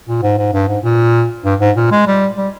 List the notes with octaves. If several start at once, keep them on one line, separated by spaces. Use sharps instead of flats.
A#2
G#2
G#2
G2
G#2
A#2
G2
G#2
A#2
G#3
G3
G3